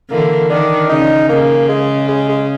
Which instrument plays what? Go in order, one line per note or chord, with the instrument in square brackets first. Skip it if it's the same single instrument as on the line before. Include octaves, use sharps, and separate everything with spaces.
[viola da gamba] D3 E3 [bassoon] A#3
[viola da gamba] D#3 [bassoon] D4
[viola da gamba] C#3 [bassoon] D#4
[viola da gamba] C#3 [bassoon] A#3
[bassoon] G#3
G#3
G#3